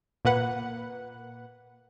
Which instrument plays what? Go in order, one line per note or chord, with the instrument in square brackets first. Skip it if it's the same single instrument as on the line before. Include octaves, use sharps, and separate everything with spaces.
[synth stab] A#2 A#3 B4 F#5